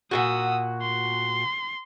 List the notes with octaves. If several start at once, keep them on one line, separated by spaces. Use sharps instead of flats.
A#2 C#3 F#4 D#6 E6
C6